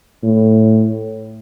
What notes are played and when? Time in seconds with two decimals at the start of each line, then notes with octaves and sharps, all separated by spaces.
0.23 A2